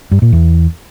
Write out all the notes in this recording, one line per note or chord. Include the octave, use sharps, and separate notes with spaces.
G2
A#2
E2